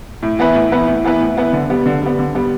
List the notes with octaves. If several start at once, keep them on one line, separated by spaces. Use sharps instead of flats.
A2
E3 B3 E4 B4
A2
E3 B3 E4 B4
A2
E3 B3 E4 B4
A2
E3 B3 E4 B4
D3
G3 B3
D3
G3 B3
D3
G3 B3